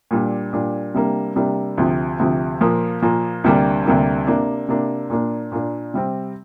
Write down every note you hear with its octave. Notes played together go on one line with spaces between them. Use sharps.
A#2 G3 D4
A#2 G3 D4
C3 G3 A#3 D4
C3 G3 A#3 D4
D2 C3 F3
D2 C3 F3
A#2 F3 A#3
A#2 F3 A#3
D2 C3 G3 A#3 D4
D2 C3 G3 A#3 D4
C3 A#3 D4
C3 A#3 D4
A#2 A#3 D4
A#2 A#3 D4
C3 G3 C4